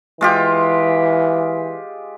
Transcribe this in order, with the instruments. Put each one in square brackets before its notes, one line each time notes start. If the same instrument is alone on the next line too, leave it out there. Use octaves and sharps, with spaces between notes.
[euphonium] E3 [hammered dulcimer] G#3 F4 G4